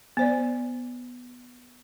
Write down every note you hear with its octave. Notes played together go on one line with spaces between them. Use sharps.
B3 C5 D5